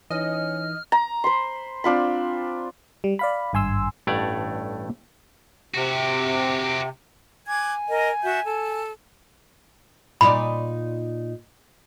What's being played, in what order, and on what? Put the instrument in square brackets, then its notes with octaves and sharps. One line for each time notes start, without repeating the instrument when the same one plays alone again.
[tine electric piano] E3 D#4 [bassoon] C#4 [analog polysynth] D#5 [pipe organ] F6
[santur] A#5
C5 B5 C6
C4 D4 F4 B5
[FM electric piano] G3
D5 F5 B5
G#1 G2 G#5 C6 E6
[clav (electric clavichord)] A1 G2 A3 C#5 D5 F#5
[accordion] C3 [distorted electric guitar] F#4 G4
[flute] G#5 [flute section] D6 F#6 G#6
[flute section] A#4 D#5
F#4 E5 G6
A4
[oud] A#2 D#4 D5 [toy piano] B5